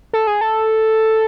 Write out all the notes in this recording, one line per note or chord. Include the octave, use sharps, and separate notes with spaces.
A4
G#4
A4